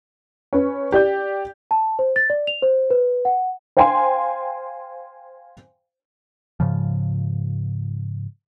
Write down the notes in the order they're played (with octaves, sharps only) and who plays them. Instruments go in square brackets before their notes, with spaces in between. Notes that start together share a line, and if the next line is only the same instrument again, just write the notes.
[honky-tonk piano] C#4 B4
G4 D5 G6
[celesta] A5
C5
A6
D5
F7
C5
B4
F#5
[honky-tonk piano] C5 F5 G5 G#5 C6
[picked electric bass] G#2 C#3 F3